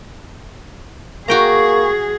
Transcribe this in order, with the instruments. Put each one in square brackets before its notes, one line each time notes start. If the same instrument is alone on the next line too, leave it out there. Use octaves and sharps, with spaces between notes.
[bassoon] A#3 [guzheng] F#4 G5 A#5 [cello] G#4 [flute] C#6